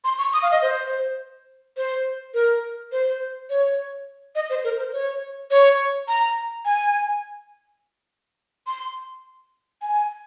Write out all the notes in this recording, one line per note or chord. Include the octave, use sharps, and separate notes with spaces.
C6
C#6
D#6
F5
D#5
C5
C5
A#4
C5
C#5
D#5
C5
A#4
C5
C#5
C#5
A#5
G#5
C6
G#5